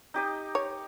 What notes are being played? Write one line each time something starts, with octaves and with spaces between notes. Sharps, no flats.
D#4 G4 D#5
C#5